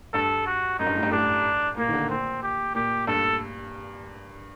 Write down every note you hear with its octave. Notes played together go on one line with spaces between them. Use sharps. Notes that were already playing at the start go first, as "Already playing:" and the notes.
G2 A4
F#4
F#2 D#4
G2
A2
G2
A2 D4
A#2 A#3
D#3
D3
A#2 C4
G4
A#2 G4
G2 A4